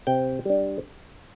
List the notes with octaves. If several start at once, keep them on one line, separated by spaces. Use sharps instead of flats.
C3 G5
G3 D4